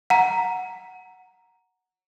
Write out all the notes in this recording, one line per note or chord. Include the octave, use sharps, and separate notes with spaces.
F#5 A#5